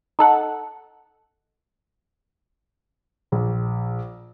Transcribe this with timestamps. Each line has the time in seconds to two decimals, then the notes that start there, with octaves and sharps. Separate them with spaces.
0.19 D#4 A4 F#5
3.32 A#1